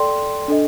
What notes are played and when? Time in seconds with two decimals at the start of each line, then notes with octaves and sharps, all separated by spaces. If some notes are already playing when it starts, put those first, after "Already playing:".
Already playing: A4 D5 G5 C6
0.48 D4 A4 D#5